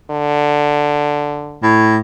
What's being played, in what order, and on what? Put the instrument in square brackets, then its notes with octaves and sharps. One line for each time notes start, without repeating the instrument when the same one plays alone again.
[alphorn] D3
[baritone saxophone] A2